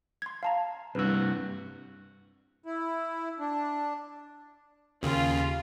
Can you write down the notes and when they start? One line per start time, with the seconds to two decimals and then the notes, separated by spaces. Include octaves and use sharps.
0.22 C6 G#6
0.43 F5 A5 A#5
0.95 C2 G2 F#4 B4 E6
2.64 E4
3.39 D4
5.03 D#2 C#3 F4